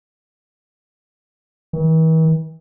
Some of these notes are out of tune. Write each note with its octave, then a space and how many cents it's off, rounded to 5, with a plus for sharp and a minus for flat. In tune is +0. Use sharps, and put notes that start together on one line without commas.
E3 -45